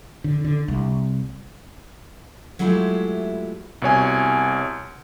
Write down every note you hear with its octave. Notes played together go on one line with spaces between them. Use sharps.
D3
D3
C2
F#3 G#3 A3 E4 F4 G4
C2 B2 C#5 G#5